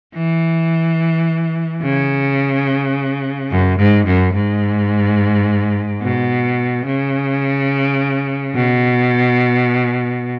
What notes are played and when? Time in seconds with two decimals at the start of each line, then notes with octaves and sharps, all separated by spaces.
0.14 E3
1.82 C#3
3.50 F#2
3.78 G#2
4.06 F#2
4.34 G#2
6.02 B2
6.86 C#3
8.55 B2